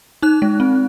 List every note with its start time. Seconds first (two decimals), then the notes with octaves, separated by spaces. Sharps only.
0.23 D#4 F#6
0.42 G#3
0.60 C4